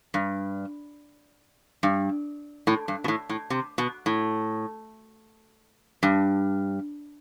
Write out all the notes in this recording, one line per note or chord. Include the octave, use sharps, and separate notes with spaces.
G2
G2
A2
G2
B2
A2
A2
C3
B2
A2
G2